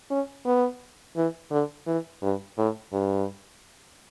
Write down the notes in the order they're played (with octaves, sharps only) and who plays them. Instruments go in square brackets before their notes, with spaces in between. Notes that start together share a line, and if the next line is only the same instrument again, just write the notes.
[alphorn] C#4
B3
E3
D3
E3
G2
A2
G2